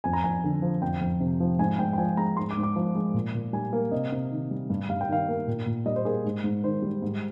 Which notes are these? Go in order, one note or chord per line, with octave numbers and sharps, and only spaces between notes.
F2 G#5
A#5
F2 G#5
D3
F3
F2 G5
F2
C3
F3
G#2 G#5
G#2 G5
G5
F3 G#5
G#3 A#5
G#2 C6
D6
G#2
D6
F3
G#3
A#2
A#2
G3 G#5
A#3
C3 D#5
C3
D#3
G3
G2
G2 F5
G5
D#3 F5
A#3
A#2
A#2
G3 D#5
C5
A#3 G#4
G#2
G#2
D#3 C5
G3
G#2